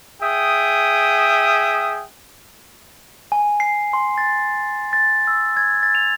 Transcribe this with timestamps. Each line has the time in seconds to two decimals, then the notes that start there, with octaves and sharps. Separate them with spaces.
0.21 G#4 E5 G5 D#6
3.32 G#5
3.60 C7
3.93 C6
4.18 A6
4.93 A6
5.27 E6
5.57 G#6
5.83 A6
5.95 F7